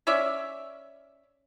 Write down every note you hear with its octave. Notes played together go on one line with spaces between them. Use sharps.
C#4 C#5 D5 E5